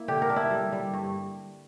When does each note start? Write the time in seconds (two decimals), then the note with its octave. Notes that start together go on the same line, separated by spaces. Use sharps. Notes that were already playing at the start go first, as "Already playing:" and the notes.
Already playing: A#3 E4
0.08 D3 G4
0.22 A#4
0.30 D4
0.36 E4
0.51 G3
0.72 G3
0.94 G2